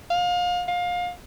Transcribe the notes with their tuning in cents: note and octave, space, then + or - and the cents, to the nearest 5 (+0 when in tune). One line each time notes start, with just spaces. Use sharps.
F5 +30
F5 +25